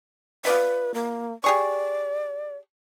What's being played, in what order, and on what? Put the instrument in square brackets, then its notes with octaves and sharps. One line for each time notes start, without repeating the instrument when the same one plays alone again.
[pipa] F4 D5 E5 [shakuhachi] B4
[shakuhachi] A#3
[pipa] G4 G#4 C#6 [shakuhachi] D5